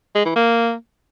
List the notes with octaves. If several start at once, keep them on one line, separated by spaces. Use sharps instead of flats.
G#3
E3
A#3